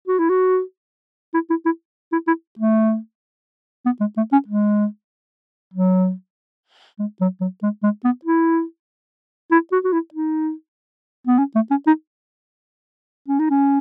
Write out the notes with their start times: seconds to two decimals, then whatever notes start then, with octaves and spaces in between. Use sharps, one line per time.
0.08 F#4
0.19 E4
0.29 F#4
1.34 E4
1.50 E4
1.66 E4
2.13 E4
2.28 E4
2.59 A3
3.86 B3
4.00 G#3
4.17 A3
4.32 C#4
4.48 G#3
5.74 F#3
6.99 G#3
7.21 F#3
7.41 F#3
7.63 G#3
7.83 G#3
8.04 B3
8.25 E4
9.51 E4
9.72 F#4
9.85 F#4
9.93 E4
10.14 D#4
11.27 B3
11.39 C#4
11.55 A3
11.71 C#4
11.87 D#4
13.28 C#4
13.40 D#4
13.50 C#4